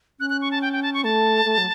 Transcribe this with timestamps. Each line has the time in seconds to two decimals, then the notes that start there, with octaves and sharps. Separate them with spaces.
0.20 C#4 F#6
0.30 F#6
0.41 C#6
0.51 A5
0.62 G5
0.73 G5
0.83 A5
0.94 C#6
1.04 A3 A5
1.45 A3
1.58 F#3